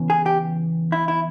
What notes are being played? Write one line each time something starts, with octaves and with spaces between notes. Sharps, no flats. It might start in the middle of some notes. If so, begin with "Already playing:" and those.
Already playing: E2 C#3 E3
G#4
G4
E4
E4